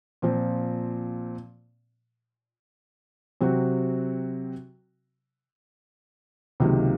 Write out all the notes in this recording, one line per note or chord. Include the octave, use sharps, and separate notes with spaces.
A#2 F3 C4
C3 F#3 C4 F#4
C#2 C3 D#3 F#3 A#3